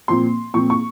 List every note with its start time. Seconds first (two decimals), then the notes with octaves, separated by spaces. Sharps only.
0.08 A#2 F3 C4 C6
0.54 A#2 F3 C4 C#6
0.70 C#6